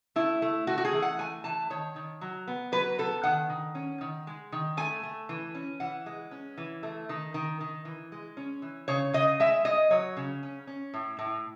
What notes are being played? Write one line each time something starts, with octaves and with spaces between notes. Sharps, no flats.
A3 E4
A3
A3 F#4
F#4
G#4
E3
F#5
A3 G#5
E3 A5
D#3 C#5
D#3
F#3
B3
F#3 B4
B3 A4
D#3 F#5
D#3
C#4
D#3
G#3
D#3
A3 G#5
A3
E3
C#4
E3 F#5
G#3
C#4
E3
A3
D#3
D#3
D#3
E3
G#3
C#4
E3
C#3 C#5
C#3 D#5
G#3 E5
G#3 D#5
F#3 C#5
C#3
C#4
C#4
A2
A2